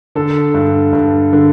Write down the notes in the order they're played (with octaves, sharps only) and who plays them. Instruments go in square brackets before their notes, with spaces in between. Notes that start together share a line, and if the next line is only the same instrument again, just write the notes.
[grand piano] D3 A4
G2
G2
D3